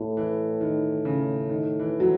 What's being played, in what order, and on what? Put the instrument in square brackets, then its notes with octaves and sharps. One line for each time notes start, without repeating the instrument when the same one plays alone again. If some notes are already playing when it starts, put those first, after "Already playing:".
Already playing: [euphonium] A2
[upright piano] E3
D#3
C#3
D#3
E3
F#3